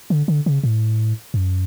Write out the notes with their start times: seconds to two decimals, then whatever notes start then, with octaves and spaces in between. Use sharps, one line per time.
0.10 D3
0.28 D3
0.46 C#3
0.64 A2
1.34 F#2